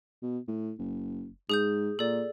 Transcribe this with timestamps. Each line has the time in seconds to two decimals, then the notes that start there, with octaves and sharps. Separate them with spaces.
0.22 B2
0.47 A2
0.79 F#1
1.50 G#2 G#4 D#6 G6
1.99 A#2 A4 D5